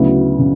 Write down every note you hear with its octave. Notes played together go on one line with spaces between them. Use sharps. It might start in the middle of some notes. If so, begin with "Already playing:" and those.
Already playing: D2 C#3 F#3 B3 E4
C#3